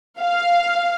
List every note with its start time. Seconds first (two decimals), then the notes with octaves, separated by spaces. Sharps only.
0.20 F5